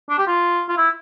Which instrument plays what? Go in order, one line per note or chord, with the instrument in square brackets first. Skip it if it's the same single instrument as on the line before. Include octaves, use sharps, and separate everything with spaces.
[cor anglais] D4
G4
F4
F4
E4